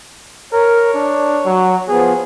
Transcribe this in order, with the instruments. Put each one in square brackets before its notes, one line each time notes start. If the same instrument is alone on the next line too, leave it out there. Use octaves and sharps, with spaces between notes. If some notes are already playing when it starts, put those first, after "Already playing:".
[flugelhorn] A#4 [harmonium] C#5
[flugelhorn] D4
F#3
[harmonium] F3 B3 [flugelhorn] G#4